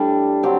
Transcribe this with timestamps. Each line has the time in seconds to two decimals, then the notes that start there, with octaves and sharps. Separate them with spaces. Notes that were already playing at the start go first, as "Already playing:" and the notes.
Already playing: A2 G3 D4 A4
0.43 D3 F#3 C4 G4